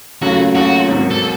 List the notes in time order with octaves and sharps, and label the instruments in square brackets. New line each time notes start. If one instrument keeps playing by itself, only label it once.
[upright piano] D#2 C#3 F#3 A3 C#4 [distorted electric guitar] F#4
[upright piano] D#2 C#3 F#3 A3 C#4 [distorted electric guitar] F#4
[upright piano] G#1 G#2 D#3 F#3
[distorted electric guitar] A4